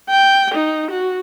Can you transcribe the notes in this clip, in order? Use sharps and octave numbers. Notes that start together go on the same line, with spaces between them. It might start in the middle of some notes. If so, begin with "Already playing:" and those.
G5
D#4
F#4